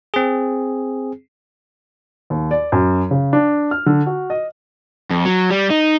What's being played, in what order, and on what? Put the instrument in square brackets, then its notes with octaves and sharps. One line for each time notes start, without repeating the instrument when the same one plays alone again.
[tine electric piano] C4 G#4
[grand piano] D#2
D5
F#2
C#3
D4
F6
D3
F#4
D#5
[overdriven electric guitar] F2
F#3
G3
D#4